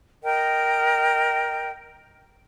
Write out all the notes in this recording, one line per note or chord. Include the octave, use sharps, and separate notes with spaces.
A#4 D#5 G5